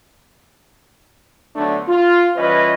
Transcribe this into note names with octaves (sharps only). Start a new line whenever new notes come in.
D3 F#3 A3 B3 D4
F4
E3 G3 C#4 F4 B4 D#5